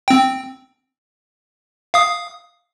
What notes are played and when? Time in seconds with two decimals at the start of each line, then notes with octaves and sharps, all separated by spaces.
0.08 C4 G5
1.94 F5 D#6